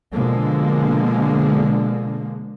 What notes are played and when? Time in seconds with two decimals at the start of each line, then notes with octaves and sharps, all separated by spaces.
0.12 B2 D3 F3 G#3 A#3